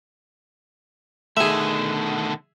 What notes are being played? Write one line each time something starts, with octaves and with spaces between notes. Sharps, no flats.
B2 D3 D#3 A3 G#4 E5